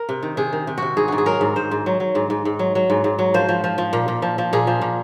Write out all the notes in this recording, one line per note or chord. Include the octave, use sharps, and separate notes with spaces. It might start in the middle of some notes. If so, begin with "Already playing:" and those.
Already playing: A#4
C3
D#3
C3 G#4
D#3
C3
C3 F#4
G#2 G#4
G#2 F#4
G#4
F#3 A#4
G#2
G#2 C5
G#2
F#3
F#3
G#2
G#2
G#2
F#3
F#3
G#2
G#2
F#3
F3 C5
F3
F3
F3
A#2
A#2
F3
F3
A#2 G#4
F3
A#2